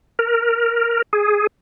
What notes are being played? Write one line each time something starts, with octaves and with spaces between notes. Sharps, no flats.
A#4
G#4